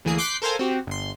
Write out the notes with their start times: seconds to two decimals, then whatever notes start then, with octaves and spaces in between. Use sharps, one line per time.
0.05 D2 E3 A#3 G#4 C7
0.18 C6 D6 F#6 G6 B6 C7
0.42 A4 A#4 C5 F5 G#5
0.59 C4 F#4 G4
0.87 G1 C6